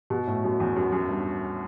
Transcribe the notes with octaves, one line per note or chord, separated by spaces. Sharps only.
B2
A2
F#2
E2
F#2
F#2
G2